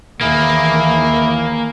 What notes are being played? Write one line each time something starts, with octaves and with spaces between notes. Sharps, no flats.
D#2 E3 A#3 E4 G#4